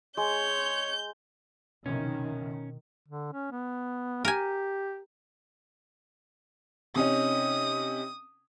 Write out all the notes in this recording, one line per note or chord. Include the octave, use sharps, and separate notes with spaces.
G#3 C#5 G6
F#1 C2 B2 D#3 C#4
D3
C#4
B3
G4 A#4 G#5
C3 C#4 D#4 D#6